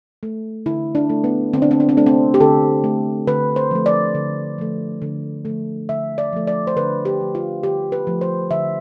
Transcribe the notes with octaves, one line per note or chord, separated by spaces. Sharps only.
A3
D3 E4
D4
A3
B3
D3 C4
D4
C4
D4
C4
A3 D4
C4
G4
D3 A4
A3
D3 B4
C5
F3 A3
D5
D3
F3 A3
D3
F3 A3
D3 E5
D5
F3 A3
D5
C5
D3 B4
G4
F3 A3
F4
D3 G4
B4
F3 A3
C5
D3 E5